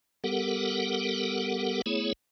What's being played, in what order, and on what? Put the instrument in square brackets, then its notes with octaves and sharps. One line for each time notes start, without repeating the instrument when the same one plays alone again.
[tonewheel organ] G3 B3 G4 A4 A#4 F#5
A3 B3 E4 G#4 C#5